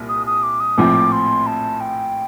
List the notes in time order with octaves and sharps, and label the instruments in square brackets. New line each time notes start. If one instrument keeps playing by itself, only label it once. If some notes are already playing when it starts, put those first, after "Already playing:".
Already playing: [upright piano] C2 A#2
[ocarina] D#6
D#6
D6
D#6
[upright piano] A#1 A2 F3 C4 [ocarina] D6
[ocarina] C6
A5
G5